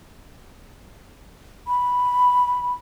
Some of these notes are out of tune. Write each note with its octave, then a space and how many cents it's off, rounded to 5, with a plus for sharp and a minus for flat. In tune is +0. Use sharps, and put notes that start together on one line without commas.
B5 -5